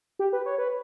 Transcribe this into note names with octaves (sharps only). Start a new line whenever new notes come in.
G4
B4
C#5
B4